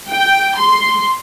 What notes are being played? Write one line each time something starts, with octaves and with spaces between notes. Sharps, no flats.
G5
C6